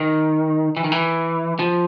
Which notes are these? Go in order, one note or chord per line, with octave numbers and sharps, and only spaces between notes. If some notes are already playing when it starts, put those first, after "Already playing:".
Already playing: D#3
E3
D#3
E3
F3